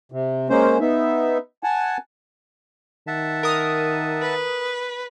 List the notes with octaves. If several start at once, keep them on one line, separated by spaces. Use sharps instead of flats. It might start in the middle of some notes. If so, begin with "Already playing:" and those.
C3
G#3 A#3 C#4 C5
B3 D#4 E5
F#5 G#5 A5
D#3 E5 F#5 A5
A#4 D#6
B4